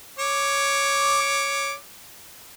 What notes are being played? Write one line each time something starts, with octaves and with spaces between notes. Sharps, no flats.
C#5 D6